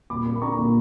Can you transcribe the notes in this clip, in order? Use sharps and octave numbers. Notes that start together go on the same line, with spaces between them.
A#2 B5 D6
A#3
B5
D4 A#5 C#6
A#2